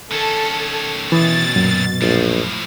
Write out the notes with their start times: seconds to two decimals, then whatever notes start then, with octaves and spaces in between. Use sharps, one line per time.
0.11 D#3 C#4 A4
1.12 B2 E3 D#6 A6
1.56 F#2 A#2 F#3
2.02 A#1 A2 F3